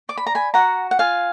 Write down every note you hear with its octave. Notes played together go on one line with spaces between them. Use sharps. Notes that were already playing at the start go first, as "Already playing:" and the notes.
D5 D6
B5
A#5
G#5 B5
F#4 F#5 A#5
F#5
F4 F5 G#5